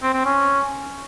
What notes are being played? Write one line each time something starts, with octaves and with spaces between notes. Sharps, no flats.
C4
C4
C#4